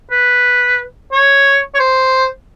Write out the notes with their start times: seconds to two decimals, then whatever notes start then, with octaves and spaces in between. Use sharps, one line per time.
0.11 B4
1.12 C#5
1.75 C#5
1.79 C5